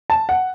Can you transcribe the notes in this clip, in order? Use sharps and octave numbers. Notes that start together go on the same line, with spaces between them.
A5
F#5